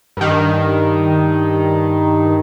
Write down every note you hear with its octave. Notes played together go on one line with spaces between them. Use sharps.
G2 D#3